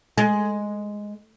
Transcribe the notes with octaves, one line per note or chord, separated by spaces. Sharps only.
G#3